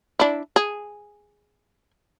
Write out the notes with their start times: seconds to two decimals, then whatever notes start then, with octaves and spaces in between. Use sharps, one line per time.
0.19 D4 E4
0.56 G#4